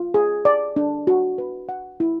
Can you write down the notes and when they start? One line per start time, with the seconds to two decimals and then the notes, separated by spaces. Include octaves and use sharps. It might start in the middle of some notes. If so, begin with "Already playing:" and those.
Already playing: F4
0.14 G#4
0.45 D5
0.76 D4
1.07 F#4
1.38 B4
1.69 F#5
2.00 E4